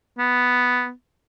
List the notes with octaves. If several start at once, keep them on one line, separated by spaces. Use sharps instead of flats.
B3